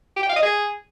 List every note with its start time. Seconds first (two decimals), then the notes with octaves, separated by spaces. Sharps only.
0.16 G4
0.23 G5
0.30 F5
0.36 D#5
0.43 G#4